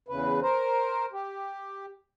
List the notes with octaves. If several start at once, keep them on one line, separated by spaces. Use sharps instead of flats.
E2 C#3 B4
A#4 C5
G4